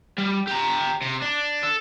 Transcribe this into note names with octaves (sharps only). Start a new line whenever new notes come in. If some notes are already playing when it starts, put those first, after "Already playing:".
G3
G4 A#5
C3
D4
A4